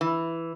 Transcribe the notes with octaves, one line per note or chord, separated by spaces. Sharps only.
E3